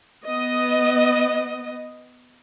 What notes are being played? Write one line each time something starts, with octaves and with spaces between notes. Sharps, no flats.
B3 D#5